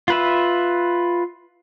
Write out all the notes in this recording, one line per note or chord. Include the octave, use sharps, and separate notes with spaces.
F4 B4 E5